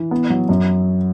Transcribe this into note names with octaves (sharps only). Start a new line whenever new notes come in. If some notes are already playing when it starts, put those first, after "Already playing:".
Already playing: E3
B3
F#3
F#2